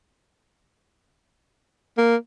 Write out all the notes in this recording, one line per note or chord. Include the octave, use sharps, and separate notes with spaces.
A#3